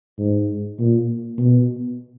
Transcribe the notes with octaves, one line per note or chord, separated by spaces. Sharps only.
G#2
A#2
B2